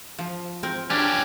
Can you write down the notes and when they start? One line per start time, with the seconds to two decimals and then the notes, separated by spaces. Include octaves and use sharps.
0.19 F3
0.63 C4 A#4
0.90 C#4 D4 G4